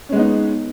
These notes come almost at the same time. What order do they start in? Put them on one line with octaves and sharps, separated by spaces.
C#4 G#3 B3 D#4